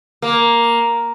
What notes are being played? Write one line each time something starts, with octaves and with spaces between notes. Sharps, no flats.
A#3